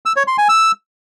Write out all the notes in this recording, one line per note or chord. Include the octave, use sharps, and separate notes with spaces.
E6
C#5
C6
G#5
E6